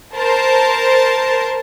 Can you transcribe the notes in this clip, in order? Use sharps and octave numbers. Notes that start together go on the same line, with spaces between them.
A#4 C5 A5